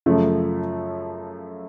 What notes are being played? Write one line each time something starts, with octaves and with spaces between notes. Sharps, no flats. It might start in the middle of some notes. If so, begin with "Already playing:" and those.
F#2 C#3 F3 A3